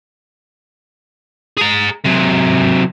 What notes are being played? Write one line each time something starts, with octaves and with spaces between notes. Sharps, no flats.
G#4 A#5
C3 F#3